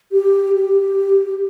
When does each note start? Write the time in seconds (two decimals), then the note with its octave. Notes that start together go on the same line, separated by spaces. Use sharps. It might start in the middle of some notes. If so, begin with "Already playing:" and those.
0.12 G4
0.56 G4